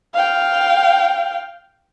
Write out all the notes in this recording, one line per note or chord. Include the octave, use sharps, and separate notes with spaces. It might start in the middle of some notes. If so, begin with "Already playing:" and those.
F5 G5